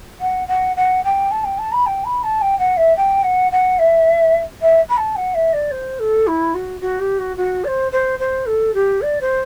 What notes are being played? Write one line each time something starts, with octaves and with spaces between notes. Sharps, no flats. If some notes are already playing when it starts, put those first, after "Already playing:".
F#5
F#5
F#5
G5
A5
G5
A5
B5
G5
B5
A5
G5
F#5
E5
G5
F#5
F#5
E5
E5
B5
A5
F#5
E5
D5
C5
A4
E4
F#4
F#4
G4
F#4
F#4
D5
C5
C5
C5
A4
G4
D5
C5